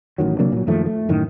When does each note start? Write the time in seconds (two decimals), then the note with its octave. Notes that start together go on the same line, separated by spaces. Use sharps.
0.18 A1 D#3 F#3
0.39 C3 F#3 A#3 D4
0.52 A#2 F#3
0.67 F#2 D#3 F3 A3
0.86 A3
1.09 F#2 A2 D#3